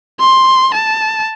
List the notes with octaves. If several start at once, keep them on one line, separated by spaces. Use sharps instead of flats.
C6
A5